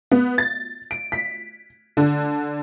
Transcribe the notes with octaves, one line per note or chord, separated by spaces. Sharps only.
B3
A6
D7
B6
D3